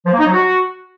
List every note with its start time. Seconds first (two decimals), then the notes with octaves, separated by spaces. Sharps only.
0.06 F3
0.13 A#3
0.20 D#4
0.26 F#3
0.33 F#4